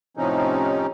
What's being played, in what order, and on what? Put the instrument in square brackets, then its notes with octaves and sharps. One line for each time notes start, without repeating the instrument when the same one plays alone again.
[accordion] A2 C3 F3 C4 C#4 D#4